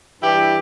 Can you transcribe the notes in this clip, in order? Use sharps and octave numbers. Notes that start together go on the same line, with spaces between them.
G2 E3 G3 E4 G4